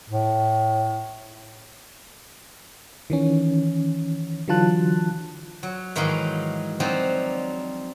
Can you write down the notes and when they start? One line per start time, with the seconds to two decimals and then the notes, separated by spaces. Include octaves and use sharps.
0.10 A2
3.10 D#3 E3 C#4
4.48 D3 E3 F#3 F4 A5 F#6
5.63 F#3
5.96 G#2 D#3 E3 F#3 D#4 F5
6.80 F3 F#3 C4 D4 D#4